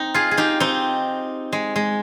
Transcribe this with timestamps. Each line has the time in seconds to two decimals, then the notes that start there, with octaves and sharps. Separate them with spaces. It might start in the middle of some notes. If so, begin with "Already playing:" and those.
Already playing: C4 D#4
0.14 F4 G#4
0.31 G#4
0.37 D#4 G4
0.60 C4 D#4
1.53 G#3
1.76 G#3